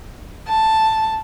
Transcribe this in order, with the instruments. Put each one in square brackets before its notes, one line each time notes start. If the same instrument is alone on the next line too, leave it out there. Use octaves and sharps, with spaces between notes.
[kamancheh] A5